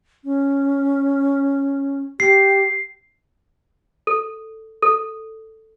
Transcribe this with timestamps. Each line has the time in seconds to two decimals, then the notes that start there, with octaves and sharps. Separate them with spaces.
0.24 C#4
2.20 G4 C7
4.07 A4
4.82 A4